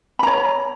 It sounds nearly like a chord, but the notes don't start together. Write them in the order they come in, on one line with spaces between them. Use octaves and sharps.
B5 A#5 C#5